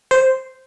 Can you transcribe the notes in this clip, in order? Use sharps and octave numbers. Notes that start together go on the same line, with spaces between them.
C5